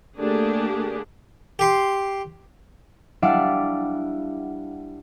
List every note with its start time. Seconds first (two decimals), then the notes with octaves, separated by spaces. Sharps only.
0.19 D3 A3 A#3 D4 G4 G#4
1.59 G4 C6
3.22 G3 D4 E4 F5 F#5 D6